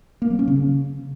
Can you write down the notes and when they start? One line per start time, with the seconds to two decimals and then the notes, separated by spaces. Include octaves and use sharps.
0.22 A#3
0.30 F#3
0.39 C#4
0.48 C#3